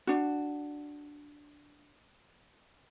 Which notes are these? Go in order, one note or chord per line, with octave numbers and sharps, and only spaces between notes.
D4 F#4